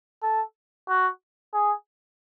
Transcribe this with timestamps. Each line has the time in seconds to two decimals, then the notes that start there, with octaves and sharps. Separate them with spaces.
0.23 A4
0.89 F#4
1.54 G#4